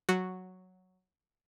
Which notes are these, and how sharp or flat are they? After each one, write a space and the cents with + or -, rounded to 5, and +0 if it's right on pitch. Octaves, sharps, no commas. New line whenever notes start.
F#3 +0 F#4 -5